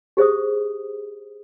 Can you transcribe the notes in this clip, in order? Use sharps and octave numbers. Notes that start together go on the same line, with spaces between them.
G4 G#4 C5 E5 D#6